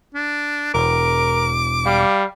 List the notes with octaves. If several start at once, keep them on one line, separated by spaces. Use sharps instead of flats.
D4
E1 A#4 D6
G3 F5